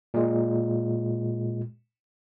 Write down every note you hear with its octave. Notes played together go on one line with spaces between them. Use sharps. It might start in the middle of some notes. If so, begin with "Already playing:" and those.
A#2 G#3